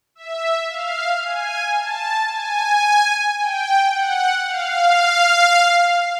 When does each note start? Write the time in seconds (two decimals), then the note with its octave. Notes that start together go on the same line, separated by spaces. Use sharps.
0.15 E5
0.69 F5
1.24 G#5
1.78 A5
2.30 G#5
3.39 G5
3.92 F#5
4.46 F5